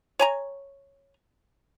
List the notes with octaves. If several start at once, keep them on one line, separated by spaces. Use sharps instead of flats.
C#5 G#5 A#5